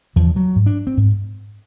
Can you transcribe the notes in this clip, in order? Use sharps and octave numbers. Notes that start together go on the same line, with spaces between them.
E2 C#3 F3
F#3
G#2
D4
C4
G#2